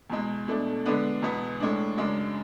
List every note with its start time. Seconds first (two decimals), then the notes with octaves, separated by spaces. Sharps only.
0.10 E2 B2 G#3
0.48 B2 A3 D4
0.85 D3 G#3 B3 D4
1.22 E2 B2 G#3 B3
1.60 A2 G#3 D4
1.97 F#2 C#3 G#3 D4